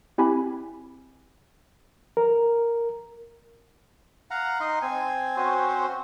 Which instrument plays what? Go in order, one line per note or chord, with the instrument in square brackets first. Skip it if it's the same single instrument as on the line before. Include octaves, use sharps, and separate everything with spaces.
[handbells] C4 E4 G4 G#5 B5
[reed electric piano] A#4
[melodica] F5 F#5 A#5
D#4 D#5 C6
C4 G#5
C4 C#4 F#4 C5